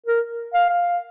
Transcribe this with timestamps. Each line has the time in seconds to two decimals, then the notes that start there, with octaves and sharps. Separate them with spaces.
0.06 A#4
0.54 F5
0.69 F5